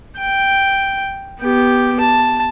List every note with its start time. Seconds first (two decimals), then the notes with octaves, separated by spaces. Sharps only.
0.18 G5
1.40 B3 G4
2.00 A5